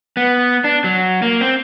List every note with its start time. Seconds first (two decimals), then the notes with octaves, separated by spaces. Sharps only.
0.17 B3
0.64 D4
0.84 F#3
1.22 A#3
1.41 C4